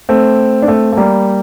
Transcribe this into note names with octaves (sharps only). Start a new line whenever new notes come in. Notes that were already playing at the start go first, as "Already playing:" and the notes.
A3 C4
D4
A3 C4
A3
G3 A#3